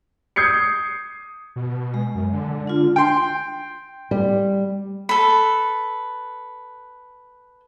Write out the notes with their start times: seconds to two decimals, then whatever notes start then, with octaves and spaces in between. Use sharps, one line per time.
0.36 D#6 G6 G#6 C7 C#7
1.56 B2
1.94 G#3
2.15 F#2
2.33 D3
2.67 D4 F4
2.96 G5 C6
4.11 G3
5.09 A4 B4